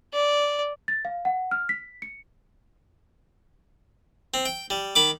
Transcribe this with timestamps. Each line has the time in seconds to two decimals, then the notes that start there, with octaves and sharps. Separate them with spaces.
0.13 D5
0.88 A6
1.05 F5
1.25 F#5
1.51 F6
1.69 B6
2.02 C#7
4.34 C4
4.46 G5
4.70 G3
4.95 D#3 B5 D6